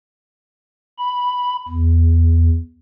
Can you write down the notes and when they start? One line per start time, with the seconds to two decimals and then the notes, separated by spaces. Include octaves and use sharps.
0.98 B5
1.69 E2